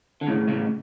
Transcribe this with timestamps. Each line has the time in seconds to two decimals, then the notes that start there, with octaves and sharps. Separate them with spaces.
0.21 D3
0.27 A2 C#3
0.48 A2 C#3